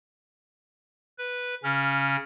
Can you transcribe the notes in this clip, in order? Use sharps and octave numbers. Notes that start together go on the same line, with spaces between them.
B4
C#3 C#4 F6